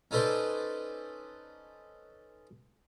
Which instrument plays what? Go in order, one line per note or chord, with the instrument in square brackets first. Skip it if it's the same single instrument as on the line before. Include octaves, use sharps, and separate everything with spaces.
[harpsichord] C#4 D#4 A4 B4 C5 D5